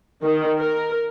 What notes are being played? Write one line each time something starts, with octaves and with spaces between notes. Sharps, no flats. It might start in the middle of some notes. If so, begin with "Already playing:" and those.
D#3
A#4